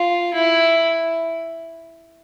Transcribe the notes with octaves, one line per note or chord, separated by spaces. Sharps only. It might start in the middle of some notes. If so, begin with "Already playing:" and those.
Already playing: F4
E4